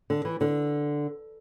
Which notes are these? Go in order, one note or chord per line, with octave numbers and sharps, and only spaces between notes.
D3
E3
D3